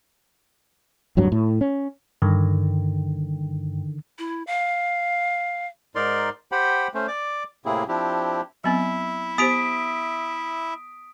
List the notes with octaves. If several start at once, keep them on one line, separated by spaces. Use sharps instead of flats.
D1 G2 F#3
A2
C#4
G2 D3 D#3
E4
F5
G#2 D#4 A#4 D5 C6
G4 C5 F#5 G5 B5
A3 C#4 C5
D5 D6
A2 C3 A#3 C4 E4 G#4
F3 C4 D4 E4 G4
F#3 B3 C4 E4 E5
B3 G4 C5 D#6 B6 D7